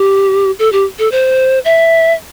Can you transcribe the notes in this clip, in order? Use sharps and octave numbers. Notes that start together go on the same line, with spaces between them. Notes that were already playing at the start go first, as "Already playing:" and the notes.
Already playing: G4
A4
G4
A4
C5
E5